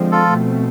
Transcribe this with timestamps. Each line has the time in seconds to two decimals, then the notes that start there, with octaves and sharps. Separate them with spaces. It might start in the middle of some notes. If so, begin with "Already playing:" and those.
Already playing: D3 F3 G#3 C4
0.12 F4 A4
0.30 B2 A3 C4